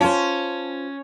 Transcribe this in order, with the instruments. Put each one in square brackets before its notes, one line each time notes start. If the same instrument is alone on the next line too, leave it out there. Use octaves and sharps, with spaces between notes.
[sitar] C#4 [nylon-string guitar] F4 C5 [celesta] A5